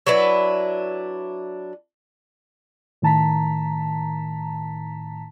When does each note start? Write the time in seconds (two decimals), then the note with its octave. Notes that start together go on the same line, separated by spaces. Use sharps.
0.07 F#3 D4 E4 B4
3.02 A2 D#3 A5 A#5 B6